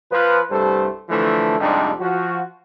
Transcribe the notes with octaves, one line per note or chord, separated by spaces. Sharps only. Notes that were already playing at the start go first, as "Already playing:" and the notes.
F3 B4
C2 G2 G3 A3 A4 C5
D3 E3 F3 A3
F2 G#2 C3 G3 D4 D#4
F3 F#4